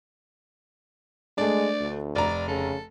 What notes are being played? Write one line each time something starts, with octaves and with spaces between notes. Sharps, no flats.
G#3 A3 D4 D5
D2
F1 D5 A#5
C#3 A4